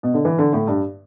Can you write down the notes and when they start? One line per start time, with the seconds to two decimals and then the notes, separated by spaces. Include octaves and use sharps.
0.03 B2
0.14 D3
0.25 E3
0.39 D3
0.53 A2
0.67 G2